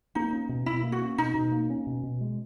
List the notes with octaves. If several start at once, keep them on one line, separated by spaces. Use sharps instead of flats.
A#3 D#4
C#4
B2
B2 E4
A#3
F#4
C#4
B2 D#4
B2
A#3
C#4
B2
B2
G#3